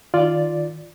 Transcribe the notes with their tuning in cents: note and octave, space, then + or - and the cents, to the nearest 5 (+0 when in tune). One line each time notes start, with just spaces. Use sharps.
D#3 +5 F4 +0 D5 +0